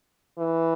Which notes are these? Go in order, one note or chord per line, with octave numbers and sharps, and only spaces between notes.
E3